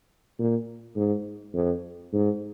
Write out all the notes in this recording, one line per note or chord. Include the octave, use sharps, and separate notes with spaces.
A#2
G#2
F2
G#2